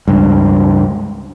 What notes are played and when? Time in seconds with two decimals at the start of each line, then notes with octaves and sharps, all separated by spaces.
0.08 C#2 G2